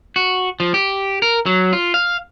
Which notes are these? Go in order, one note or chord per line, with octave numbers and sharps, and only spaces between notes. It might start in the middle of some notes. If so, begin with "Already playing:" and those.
F#4
F3
G4
A#4
F#3
F4
F5